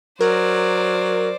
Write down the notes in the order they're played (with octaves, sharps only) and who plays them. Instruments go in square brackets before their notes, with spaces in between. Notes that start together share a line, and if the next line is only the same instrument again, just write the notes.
[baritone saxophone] F#3 [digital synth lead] A#4 [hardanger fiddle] C5 D5